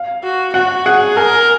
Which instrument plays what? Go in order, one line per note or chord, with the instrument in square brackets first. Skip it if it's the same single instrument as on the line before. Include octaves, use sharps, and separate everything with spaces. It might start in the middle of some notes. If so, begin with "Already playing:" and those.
Already playing: [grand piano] F5
[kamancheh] F#4
[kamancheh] F#4 [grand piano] F#5
[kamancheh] G#4 [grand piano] F#5
[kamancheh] A#4 [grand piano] G#5